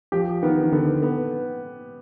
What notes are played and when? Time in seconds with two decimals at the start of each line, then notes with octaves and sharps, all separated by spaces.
0.12 F3 G4
0.43 D#3 B3
0.63 D#3
0.72 D3 B3
1.03 B3